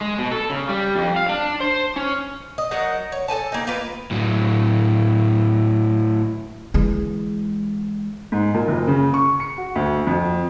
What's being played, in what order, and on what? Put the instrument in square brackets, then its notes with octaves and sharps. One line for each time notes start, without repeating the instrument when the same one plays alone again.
[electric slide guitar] G#3
B2
A4
C#3
G3
F2
F5
D4
C5
C#4
[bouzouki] D#5
F#3 D#4 A#4 F#5
C#5
A4 B4 G#5 A5
A#3 C4 D#4
A#3 F4 A#4 B4
[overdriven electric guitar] A2 F#3
[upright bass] E3 G#3
[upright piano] G#2
A#2
F#1
C#3
C#6
C#7
F#4
D2
F2